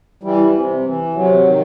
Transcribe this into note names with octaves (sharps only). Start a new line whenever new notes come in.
E3 G3
C3
E3
C3 F#3
D#3